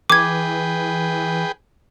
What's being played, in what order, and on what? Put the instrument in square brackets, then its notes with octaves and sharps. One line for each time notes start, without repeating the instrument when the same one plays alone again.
[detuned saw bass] E3 [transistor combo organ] G#4 B4 G5 [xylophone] D6 G#6